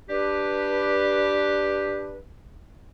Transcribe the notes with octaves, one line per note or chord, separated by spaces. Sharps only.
D4 G4 B4